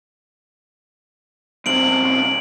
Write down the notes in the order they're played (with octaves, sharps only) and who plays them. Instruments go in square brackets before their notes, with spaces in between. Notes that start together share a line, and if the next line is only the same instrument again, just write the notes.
[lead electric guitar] B1 C4 [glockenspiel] D7 F#7